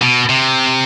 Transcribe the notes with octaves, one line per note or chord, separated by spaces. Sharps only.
B2
C3